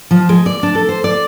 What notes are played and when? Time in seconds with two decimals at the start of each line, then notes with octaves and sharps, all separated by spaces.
0.11 F3
0.29 G#3
0.46 D5
0.63 D4
0.75 A4
0.89 C5
1.04 D5